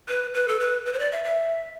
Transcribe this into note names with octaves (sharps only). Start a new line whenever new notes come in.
B4
B4
A4
B4
B4
C5
D5
E5
E5